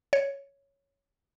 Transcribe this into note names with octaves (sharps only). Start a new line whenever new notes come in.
C#5